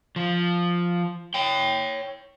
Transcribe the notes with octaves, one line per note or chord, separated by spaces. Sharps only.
F3
C#5 G5